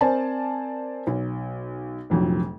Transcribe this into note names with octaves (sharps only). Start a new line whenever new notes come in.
C4 A#4 C5 D5 G#5 A5
B1
F1 A#1 F2 F3 F#3 D#4